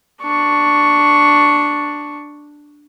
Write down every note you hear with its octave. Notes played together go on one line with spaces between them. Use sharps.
D4 C#6